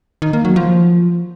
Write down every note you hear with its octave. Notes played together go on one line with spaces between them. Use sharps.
D#3
A#3
F#3
F3